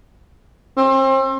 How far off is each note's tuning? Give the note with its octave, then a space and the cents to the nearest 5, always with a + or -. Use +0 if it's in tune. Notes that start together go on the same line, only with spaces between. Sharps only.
C4 +35